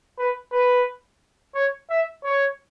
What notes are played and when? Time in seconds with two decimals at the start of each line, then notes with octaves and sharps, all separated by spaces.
0.18 B4
0.52 B4
1.55 C#5
1.90 E5
2.24 C#5